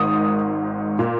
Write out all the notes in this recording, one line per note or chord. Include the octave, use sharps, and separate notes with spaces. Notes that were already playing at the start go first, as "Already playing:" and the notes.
Already playing: G#1 G#2 D#3 D#6
A#2